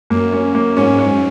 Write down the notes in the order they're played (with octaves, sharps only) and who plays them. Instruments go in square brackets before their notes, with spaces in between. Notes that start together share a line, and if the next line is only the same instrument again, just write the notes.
[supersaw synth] F#2 [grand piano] A#3
[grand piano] C#4
A#3
[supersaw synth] G#2 [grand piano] C#4
[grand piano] C#4